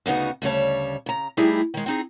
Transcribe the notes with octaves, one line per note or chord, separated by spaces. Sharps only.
D2 C#3 B3 D#4 F#4
D2 C#3 G3 C#5 A5
C#3 A#5
G3 A3 D#4 E4 G4 G#4
D#3 G#3
C4 D#4 G#4